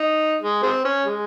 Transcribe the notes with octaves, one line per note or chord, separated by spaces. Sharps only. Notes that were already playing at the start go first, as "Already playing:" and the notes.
Already playing: D#4
G#3
G#3 C4
C#4
G#3